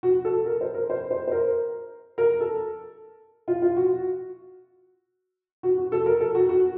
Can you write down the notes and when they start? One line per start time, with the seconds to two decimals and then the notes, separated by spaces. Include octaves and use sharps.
0.03 F#4
0.25 A4
0.46 A#4
0.61 C5
0.74 A#4
0.90 C5
1.11 C5
1.28 C5
1.32 A#4
2.18 A#4
2.40 A4
3.48 F4
3.62 F4
3.77 F#4
5.63 F#4
5.78 F#4
5.92 A4
6.06 A#4
6.21 A4
6.35 F#4
6.49 F#4